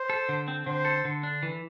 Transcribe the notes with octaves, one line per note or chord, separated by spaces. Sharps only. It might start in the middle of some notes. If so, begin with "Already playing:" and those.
Already playing: C5
A4
D3
C4
D3 C5
A4
D3
D4
E3